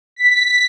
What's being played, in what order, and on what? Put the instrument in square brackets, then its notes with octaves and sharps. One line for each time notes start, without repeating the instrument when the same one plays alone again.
[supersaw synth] B6